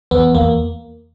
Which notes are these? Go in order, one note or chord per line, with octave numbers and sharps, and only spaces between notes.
E2 B3
E2 A#3